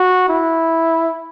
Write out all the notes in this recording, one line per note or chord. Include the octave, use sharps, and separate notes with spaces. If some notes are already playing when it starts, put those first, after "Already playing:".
Already playing: F#4
E4